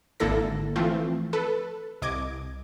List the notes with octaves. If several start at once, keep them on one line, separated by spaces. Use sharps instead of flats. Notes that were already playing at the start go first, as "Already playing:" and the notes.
G#1 D3 A#3 E4 A4 A#6
E3 F3 A3 C4 F4
A4 B4
C2 D#5 D6 G#6